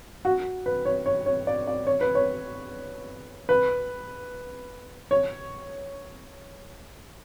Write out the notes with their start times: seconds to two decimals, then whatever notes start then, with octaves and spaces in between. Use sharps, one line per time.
0.25 F#4
0.66 B4
0.85 C#5
1.06 C#5
1.26 C#5
1.47 D5
1.68 D5
1.87 C#5
2.01 B4
2.15 C#5
3.49 B4
5.11 C#5